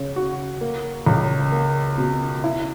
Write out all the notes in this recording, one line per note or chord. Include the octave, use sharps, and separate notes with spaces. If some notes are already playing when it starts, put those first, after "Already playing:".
Already playing: C#3
F#4
A#3
C#2
A#3
B2
E4